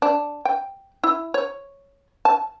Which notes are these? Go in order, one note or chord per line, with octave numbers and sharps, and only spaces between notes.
D4
G5
E4
C#5
A5